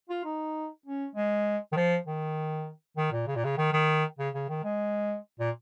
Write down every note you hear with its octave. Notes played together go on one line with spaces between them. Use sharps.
F4
D#4
C#4
G#3
D#3
F3
D#3
D#3
A#2
C#3
A#2
C#3
D#3
D#3
C#3
C#3
D#3
G#3
A#2